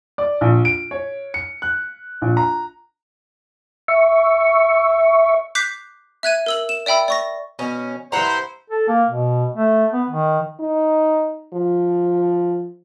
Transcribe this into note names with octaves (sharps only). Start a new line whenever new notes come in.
D5
A#1
D7
C#5
C#7
F#6
A#1
A#5
E5 C#6
D6 F#6 G6 B6 C7
E5 F#6 G#6 D#7
A#4 E6 F#7
E7
D5 E5 G5 B5 E6
D5 C#6 A#6
B2 C#4
G2 E4 C5 F#5 G5 A#5 C6
A4
A#3
B2
A3
B3
D#3
D#4
F3